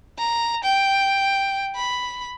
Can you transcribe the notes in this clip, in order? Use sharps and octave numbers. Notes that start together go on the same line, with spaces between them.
A#5
G5
B5